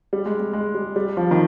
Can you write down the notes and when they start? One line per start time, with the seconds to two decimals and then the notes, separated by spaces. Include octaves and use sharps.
0.13 G3
0.26 G#3
0.40 G#3
0.53 G#3
0.75 G3
0.96 G3
1.17 F3
1.31 D#3